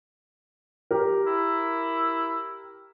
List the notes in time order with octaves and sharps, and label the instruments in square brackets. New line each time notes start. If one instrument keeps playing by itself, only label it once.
[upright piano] G4 A#4
[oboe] E4